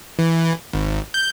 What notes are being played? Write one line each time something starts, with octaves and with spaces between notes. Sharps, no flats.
E3
G#1
G6